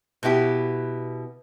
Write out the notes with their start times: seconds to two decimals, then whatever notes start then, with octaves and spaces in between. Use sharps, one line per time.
0.23 B2 B3 E4 G4